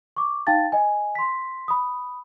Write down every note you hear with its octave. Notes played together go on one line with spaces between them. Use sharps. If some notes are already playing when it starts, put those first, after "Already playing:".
C#6 D6
D#4 F5 G5 A5 A6
D#5 G#5
C6 B6
B5 D#6